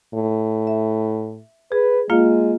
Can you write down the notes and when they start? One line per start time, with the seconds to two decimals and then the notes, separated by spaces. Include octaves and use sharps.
0.14 A2
0.67 E5
1.72 G#4 B4
2.10 G#3 A#3 F4 F5